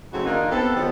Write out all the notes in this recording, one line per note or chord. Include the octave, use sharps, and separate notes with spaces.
C#3 F#3 A3 C4 D#4 F#4
D#3 A#3 D4 D#4 F4
B3 C4 G4 A4
D#3 F3 F#3 G#3 B3